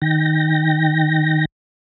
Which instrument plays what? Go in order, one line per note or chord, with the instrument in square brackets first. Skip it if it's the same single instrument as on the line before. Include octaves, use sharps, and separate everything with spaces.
[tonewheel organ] D#3 G5 A#6